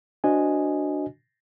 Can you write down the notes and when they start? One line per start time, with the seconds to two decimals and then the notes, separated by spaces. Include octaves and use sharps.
0.24 D4 F#4 C5 D#5 G#5